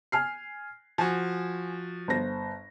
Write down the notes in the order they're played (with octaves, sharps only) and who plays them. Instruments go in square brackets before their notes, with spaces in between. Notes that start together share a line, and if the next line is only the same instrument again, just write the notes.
[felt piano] G#5 F6 C7
[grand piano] F3 F#4 [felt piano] G#5
[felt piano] G1 C5 A#6